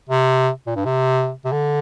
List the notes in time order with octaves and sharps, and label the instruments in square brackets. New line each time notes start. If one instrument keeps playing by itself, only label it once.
[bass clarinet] C3
A#2
G2
C3
C3
D3